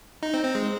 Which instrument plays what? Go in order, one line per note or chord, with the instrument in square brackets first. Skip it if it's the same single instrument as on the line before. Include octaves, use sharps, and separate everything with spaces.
[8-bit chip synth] D#4
C4
C4
G#3